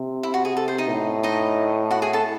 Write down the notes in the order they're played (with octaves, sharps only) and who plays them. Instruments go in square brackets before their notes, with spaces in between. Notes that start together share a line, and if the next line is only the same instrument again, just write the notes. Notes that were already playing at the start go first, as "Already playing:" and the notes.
Already playing: [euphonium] C3
[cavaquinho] E4
F#4
G#4
A4
C5
D#4 D#5
[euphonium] A2
[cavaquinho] D#4 D#5
F#4 F#5
G#4 G#5
A4 A5